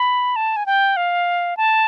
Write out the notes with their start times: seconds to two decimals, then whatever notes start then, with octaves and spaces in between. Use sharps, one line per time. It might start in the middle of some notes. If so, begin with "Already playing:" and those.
Already playing: B5
0.36 A5
0.56 G#5
0.66 G5
0.97 F5
1.57 A5